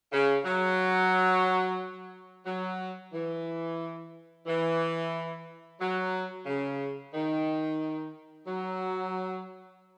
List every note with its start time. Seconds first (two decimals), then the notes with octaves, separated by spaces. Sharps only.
0.12 C#3
0.45 F#3
2.45 F#3
3.13 E3
4.46 E3
5.80 F#3
6.46 C#3
7.14 D#3
8.47 F#3